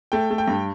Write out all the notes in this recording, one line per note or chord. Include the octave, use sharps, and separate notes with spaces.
A3 G5
A3
G5
G2